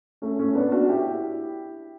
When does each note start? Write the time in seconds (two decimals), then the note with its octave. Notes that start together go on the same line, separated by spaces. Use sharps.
0.22 A3 C#4
0.39 A3 C#4
0.55 B3 D4
0.72 D4 F#4
0.88 E4 G4